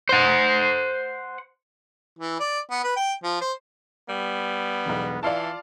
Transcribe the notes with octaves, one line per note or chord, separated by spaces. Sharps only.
C5 F#5
E3
D5
B3
B4
G5
F3
C5
G3 B3
E1 B1
E3 F4 D5 F5 A5